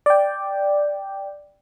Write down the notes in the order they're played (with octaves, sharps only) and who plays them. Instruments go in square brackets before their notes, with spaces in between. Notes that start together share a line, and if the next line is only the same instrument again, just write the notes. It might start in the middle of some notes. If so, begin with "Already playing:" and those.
[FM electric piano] D5 G5